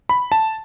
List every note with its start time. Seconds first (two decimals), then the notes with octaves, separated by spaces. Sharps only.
0.09 B5
0.32 A5